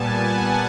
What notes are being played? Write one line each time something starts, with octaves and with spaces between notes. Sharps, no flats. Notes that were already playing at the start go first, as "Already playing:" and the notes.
Already playing: A#2 G3 B3 G#5 A5
F#5